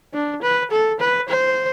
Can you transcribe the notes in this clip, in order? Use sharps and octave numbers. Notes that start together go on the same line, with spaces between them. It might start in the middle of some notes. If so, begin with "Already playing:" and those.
D4
B4
A4
B4
C5